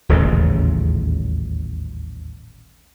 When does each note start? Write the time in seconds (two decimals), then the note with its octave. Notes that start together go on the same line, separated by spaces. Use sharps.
0.09 D#1 A1 E2 C#3